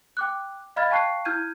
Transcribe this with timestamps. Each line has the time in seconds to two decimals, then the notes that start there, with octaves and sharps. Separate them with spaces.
0.17 G5 D6 F#6
0.76 D#5 F5 B5 F6 G#6 A6
0.90 F5 G5 A5 C#6 F#6 C7
1.25 E4 F6 G6 G#6 D#7